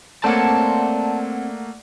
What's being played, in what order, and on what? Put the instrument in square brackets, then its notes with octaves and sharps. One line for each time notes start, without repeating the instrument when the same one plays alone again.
[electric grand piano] A3 A#3 [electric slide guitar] C4 C#5 [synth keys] D5 F#5 [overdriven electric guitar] A5